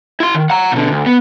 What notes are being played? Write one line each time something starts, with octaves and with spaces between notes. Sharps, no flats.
E4 C6
D#3
F#5 A#5
B2 D3
D2
B3